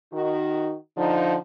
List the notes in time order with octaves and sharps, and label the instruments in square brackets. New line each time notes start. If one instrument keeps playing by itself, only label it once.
[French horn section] D#3 D#4 F#4
D3 F3 D#4